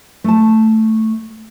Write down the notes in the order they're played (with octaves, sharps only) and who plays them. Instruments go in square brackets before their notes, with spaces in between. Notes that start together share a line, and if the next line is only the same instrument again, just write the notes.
[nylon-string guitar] A3 A5